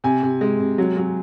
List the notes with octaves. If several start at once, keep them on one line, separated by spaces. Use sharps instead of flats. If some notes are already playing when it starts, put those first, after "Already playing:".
C3 G#5
C3
G#3
C3
F#3
F#3